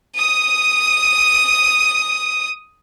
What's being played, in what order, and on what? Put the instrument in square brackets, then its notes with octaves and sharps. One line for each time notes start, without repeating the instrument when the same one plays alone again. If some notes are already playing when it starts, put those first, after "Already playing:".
[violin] D#6 D#7